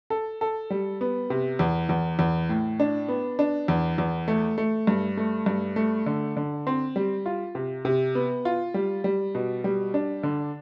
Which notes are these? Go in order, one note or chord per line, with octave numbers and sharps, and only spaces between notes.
A4
A4
G3
B3
C3
E2
E2
E2
A2
D4
B3
D4
E2
E2
A3
A3
G2
A3
G2
A3
D3
D3
C4
G3
F4
C3
C3
B3
F4
G3
G3
B2
G3
D4
D3